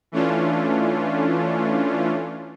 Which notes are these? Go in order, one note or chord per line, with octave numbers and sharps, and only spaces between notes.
E3 A3 C#4 D4 F4